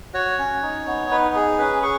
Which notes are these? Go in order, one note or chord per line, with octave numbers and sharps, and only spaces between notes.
F#4 C#5
C#4
D#4
B3
D#4 B4
G#4
C#4 B4
G#4 C#6